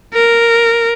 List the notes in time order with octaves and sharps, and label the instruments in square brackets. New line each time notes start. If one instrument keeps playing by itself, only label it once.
[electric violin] A#4